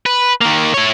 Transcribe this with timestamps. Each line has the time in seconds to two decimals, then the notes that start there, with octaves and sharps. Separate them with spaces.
0.06 B4
0.41 D#3 A#3
0.74 E4 C#5